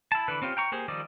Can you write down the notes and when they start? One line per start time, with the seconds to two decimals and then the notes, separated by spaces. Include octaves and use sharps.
0.12 E4 A5
0.28 D3 E3 B4
0.42 C4 C#4 F4 G4
0.57 G5 A#5 C#6
0.72 A#3 G4 G#4 C5
0.88 D#3 F3 G3 D5 D#5